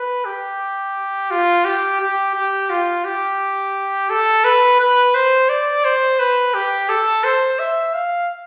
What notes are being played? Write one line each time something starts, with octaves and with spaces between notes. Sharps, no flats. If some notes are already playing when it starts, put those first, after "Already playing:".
Already playing: B4
G4
F4
G4
G4
G4
F4
G4
A4
B4
B4
C5
D5
C5
B4
G4
A4
C5
E5
F5